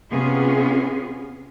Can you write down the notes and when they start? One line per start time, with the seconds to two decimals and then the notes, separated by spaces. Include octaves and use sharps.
0.11 C3 B3 C#4 F4 G#4